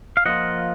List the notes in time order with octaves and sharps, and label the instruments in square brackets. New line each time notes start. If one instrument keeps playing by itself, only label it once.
[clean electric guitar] F5
F3 A#3 F4 D#5 F#5